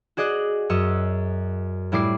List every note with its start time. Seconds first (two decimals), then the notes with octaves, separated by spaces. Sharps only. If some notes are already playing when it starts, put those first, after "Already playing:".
0.17 F#4 G#4 D5 D#5 F#6
0.70 F#2 D#5 C#6 E6
1.92 A2 G3 E4 D5 D6 C7